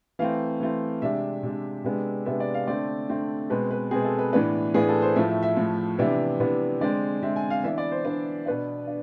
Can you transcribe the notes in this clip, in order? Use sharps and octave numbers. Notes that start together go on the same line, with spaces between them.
E3 A3 C4 F5
E3 A3 C4
C3 G#3 D4 E5
C3 G#3 D4
C3 G#3 B3 D4
C3 G#3 B3 D4 E5
D5
F5
D3 A3 C4 D5
D3 A3 C4
B2 G#3 C4 B4
B4
B2 G#3 C4 G#4
A4
B4
A2 E3 B3 D4 B4
A2 E3 B3 D4 G#4
A4
C5
A2 F3 A3 E5
E5
E5
A2 F3 A3
C3 E3 B3 D4 E5
C3 E3 B3 D4
D3 G#3 C4 D5
D3 G#3 C4 E5
G#5
F5
E3 B3 D4 E5
D5
C5
E3 B3 D4
B2 B3 D4 B4
D4